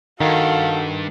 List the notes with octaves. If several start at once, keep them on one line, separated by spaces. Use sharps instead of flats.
G2 D#3 F#4 A4 F5